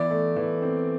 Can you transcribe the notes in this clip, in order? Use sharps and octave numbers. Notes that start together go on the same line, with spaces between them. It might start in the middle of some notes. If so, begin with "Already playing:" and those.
Already playing: E3 B3 D5
A3
E3
C4